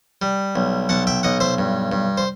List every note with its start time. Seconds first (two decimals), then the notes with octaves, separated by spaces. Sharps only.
0.22 G3
0.56 B1
0.89 B1 F#5 A5
1.07 E5 G5
1.23 B1 D#5 F#5
1.40 C5 E5
1.58 G2
1.92 G2
2.18 C5